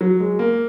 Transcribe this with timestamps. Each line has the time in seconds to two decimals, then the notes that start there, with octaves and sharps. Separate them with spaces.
0.01 F#3
0.20 G#3
0.39 A#3